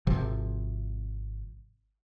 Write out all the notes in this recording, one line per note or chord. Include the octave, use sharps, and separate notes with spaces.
G#1 C3 F3